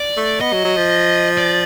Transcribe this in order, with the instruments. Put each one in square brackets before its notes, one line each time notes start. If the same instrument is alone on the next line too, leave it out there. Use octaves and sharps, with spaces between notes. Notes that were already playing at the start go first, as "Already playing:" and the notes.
Already playing: [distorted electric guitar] D5
[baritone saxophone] A3
[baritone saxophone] B3 [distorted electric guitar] D#5
[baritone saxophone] F#3
F#3
F3
[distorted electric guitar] D5